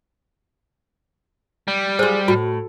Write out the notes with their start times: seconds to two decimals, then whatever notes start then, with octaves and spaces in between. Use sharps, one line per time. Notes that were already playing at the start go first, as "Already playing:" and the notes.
1.68 G3
1.99 F4 G#4 C5
2.28 A2 F#4